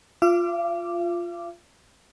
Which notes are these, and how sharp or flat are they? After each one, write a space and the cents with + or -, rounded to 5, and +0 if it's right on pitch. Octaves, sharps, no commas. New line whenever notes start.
F4 +0 F5 -45 D6 +0